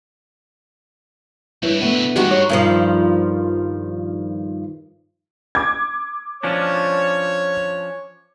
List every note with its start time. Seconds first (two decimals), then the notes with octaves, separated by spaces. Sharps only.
1.63 D2 G2 E4 B4 C#5
1.80 C3 A3 B3 D4 B4
2.16 G2 G#3 D#4 F#4 G4
2.31 C#5
2.49 G2 D#3 F3
5.55 D6 G#6
6.43 F3 C#4 D4 C#5